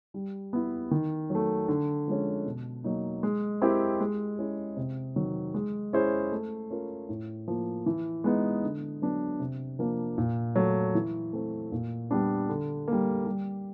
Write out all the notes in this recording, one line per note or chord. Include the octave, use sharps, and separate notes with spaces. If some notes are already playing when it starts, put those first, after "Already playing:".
G3
B3 E4
D#3
F#3 A3
D3
F3 G#3 C#4
B2
F#3 A#3 D#4
G#3
C4 E4 G4 A#4
G#3
C#4 E4 G#4
C3
D#3 F#3
G#3
C#4 E4 G#4 C5
A3
C#4 F4 A#4
A2
F3 A#3
E3
G#3 B3 D#4
D3
F#3 B3 D4
C3
F3 A#3 D4
A#2
F#3 A3
E3
A3 C4
A#2
G3 B3 D4
D3
G3 A#3
G3